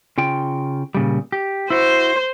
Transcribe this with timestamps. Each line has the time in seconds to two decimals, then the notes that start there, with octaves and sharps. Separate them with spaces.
0.18 C#3 F4 G5
0.95 A#2 C#3 G3
1.32 G4
1.70 E4 F#4 C5